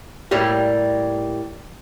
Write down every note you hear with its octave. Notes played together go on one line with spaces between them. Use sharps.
A2 G3 A#3 G4